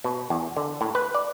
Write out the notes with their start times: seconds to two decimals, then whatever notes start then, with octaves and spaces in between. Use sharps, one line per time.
0.04 B2
0.30 E2
0.57 D3
0.81 A2
0.95 B4
1.14 D5